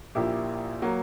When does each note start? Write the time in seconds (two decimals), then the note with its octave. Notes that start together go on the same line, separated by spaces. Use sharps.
0.15 A#1 A#2 A#3 E4 G4
0.82 F#3 A#3